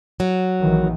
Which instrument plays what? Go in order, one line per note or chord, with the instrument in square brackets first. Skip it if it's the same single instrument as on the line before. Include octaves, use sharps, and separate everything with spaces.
[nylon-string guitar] F#3
[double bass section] A#1 D#3 E3